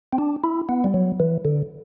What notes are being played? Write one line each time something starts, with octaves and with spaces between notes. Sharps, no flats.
C4
D4
E4
B3
G3
F#3
E3
D3